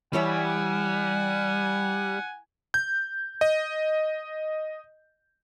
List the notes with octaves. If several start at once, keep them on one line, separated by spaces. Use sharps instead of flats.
E3 G3 C#5 E5 F#5 G#5
G6
D#5